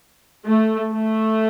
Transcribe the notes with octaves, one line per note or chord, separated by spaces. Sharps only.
A3
A3